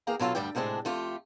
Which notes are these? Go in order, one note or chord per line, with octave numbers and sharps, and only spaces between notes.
E3 A#3 G#4 F5 G5 A#5
B2 F#3 F4 A4
D2 G2 G3 G4 G5
A2 C3 G#3 C4 D4
F2 A3 F4 G4